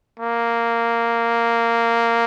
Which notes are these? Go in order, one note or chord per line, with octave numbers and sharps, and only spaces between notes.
A#3